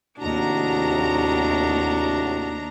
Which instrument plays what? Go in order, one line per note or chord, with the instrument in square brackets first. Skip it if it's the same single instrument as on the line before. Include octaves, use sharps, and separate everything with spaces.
[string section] D#2 A#5 [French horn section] A2 C3 F#4 [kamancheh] D4